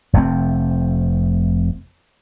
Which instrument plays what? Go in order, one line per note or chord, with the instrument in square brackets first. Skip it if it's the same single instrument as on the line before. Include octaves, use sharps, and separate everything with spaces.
[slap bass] F1 C3 A3 C4